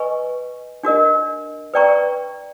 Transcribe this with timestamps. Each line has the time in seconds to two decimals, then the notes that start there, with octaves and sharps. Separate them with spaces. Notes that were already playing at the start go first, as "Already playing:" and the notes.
Already playing: B4 D#5 G#5 C#6
0.83 D4 F#4 A#4 D#5
1.74 B4 D5 G5 A#5 C#6